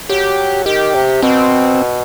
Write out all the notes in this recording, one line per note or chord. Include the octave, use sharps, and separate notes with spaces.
F#3 G4
D#3 G4
C3
B2 C4